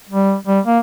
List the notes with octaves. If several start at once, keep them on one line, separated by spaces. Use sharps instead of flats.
G3
G3
A#3